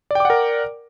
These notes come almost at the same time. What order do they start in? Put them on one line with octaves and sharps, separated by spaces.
D5 G5 D6 F#5 A#4